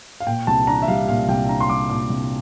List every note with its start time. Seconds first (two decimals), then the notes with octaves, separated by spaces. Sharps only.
0.20 F5
0.27 A#2 G5
0.47 C2 A5
0.67 D4 A#5
0.82 E5
0.88 G3 F5
1.08 A#2 F5
1.28 C2 G5
1.49 D4 A#5
1.60 C6
1.69 G3 D6
1.90 A#2 D6
2.10 C2